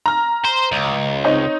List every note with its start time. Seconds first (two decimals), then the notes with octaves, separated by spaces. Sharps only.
0.06 A#5 F6
0.45 C5
0.72 C#2
1.24 C4 D#4 C#5